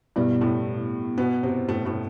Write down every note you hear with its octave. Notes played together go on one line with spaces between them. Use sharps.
G2 B2 G3 B3 E4
A2 A3
B2 B3
C3 C4
A2 A3
A2 A3